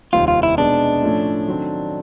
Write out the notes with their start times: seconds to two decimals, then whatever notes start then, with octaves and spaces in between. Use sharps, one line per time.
0.13 F1 D#2 D#3 G3 C4 F4
0.28 F4
0.43 E4
0.58 B2 G#3 B3 D4 D#4
1.02 A2 F3 A3 C#4
1.47 D#3 F#3 A3 C4